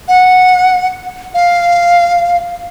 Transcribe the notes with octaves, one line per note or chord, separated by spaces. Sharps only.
F#5
F5